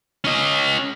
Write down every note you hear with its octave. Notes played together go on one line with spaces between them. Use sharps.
C#4 D#5